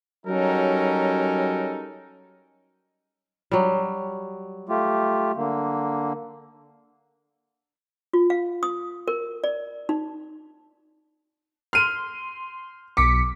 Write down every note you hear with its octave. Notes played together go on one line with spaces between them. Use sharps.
F#3 G3 C#4 D#4 A4 A#4
F#3 G3
A3 F4 G4
D3 A#3
F4
F5
D#6
A#4
D5
D#4
C6 F6 D#7
B1 D6 B6 C#7